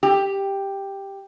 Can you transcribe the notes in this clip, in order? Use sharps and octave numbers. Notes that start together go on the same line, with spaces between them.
G4